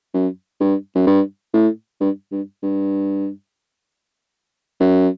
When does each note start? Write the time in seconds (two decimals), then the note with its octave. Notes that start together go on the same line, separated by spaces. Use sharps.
0.14 F#2
0.61 G2
0.95 F#2
1.07 G2
1.54 A2
2.00 G2
2.32 G2
2.63 G2
4.80 F#2